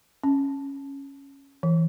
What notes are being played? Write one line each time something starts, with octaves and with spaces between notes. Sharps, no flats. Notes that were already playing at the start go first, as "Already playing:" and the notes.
C#4
E3